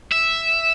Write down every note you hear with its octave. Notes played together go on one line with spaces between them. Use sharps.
E5